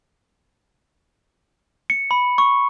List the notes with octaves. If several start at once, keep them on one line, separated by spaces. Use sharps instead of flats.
C#7
B5
C#6